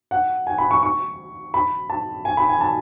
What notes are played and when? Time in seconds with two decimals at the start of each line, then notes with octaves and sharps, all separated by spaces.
0.11 F#5
0.47 G#5
0.58 B5
0.71 C#6
0.83 C#6
1.54 B5
1.90 A5
2.25 G#5
2.37 B5
2.49 G#5
2.61 A5